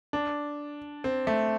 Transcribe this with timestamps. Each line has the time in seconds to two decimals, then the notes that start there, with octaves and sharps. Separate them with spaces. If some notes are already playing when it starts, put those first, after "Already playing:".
0.13 D4
1.04 C4
1.27 A3